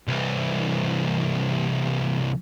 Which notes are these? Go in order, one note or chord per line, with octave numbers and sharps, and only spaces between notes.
C2 E3